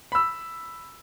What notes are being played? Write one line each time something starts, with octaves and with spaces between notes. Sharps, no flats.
B5 E6